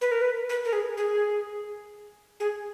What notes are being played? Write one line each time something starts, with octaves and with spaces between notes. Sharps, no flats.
B4
A#4
B4
B4
A#4
G#4
G#4
G#4